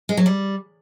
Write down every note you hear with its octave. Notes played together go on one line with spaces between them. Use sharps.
G#3
F#3
G3